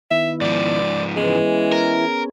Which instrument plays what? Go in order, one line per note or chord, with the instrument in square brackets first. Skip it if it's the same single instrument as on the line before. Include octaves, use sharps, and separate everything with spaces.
[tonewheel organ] D#3 B3 E4 [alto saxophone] E5
[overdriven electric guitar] G#2 F3 [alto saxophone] D5
[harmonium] E3 [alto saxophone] G#3 [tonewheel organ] B3 C#4 G#4
[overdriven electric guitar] A#4